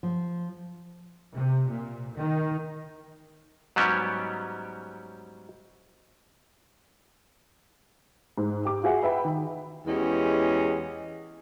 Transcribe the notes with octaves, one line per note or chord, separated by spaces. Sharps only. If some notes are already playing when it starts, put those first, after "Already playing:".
F3
C3
A#2
D#3
G#2 F#3 G3 B3 C#4 G4
G#2
G4 D6
F4 F#4 G#4 E5 F#5
B4 E5 G5 B5
D#3
E2 E3 G#3 C#4 G4 D#5